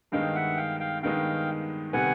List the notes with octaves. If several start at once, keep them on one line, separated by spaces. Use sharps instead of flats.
G2 D#3 G#3 B3 D#4 F5 G5
E5 F#5
F5 G5
F5 G5
G2 D#3 G#3 B3 D#4 F5 G5
C3 D#3 G3 B3 F#5 G#5